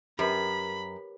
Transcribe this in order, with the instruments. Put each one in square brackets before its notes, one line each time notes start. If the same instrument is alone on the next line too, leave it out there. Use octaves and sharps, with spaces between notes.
[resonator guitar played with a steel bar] F#2 [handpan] G4 A#4 B4 [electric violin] B5